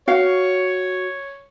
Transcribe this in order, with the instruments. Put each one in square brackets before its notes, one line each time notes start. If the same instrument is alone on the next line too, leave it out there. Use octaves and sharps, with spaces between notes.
[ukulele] F#4 F5 [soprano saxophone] C#5